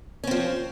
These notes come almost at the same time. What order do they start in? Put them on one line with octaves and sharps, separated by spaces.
C#4 C4 F3